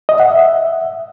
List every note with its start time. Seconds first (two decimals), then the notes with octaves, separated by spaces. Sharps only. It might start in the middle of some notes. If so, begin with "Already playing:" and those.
0.09 D#5
0.20 F#5
0.30 E5